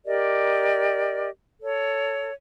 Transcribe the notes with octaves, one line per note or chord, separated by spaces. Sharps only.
G4 A#4 D5 D#5
A4 C#5